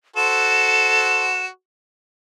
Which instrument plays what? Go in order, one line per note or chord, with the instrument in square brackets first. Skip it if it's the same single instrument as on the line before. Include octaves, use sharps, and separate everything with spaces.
[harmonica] F#4 A4 C5 [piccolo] E7